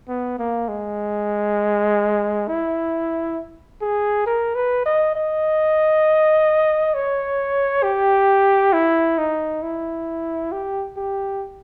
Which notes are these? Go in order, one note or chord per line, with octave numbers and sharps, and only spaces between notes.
B3
A#3
G#3
E4
G#4
A#4
B4
D#5
D#5
C#5
G4
E4
D#4
E4
G4
G4